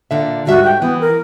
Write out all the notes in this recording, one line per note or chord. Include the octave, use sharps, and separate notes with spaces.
A#2 D3 E5
G#2 G3 F#4 E5
G5
E3 B3
A#4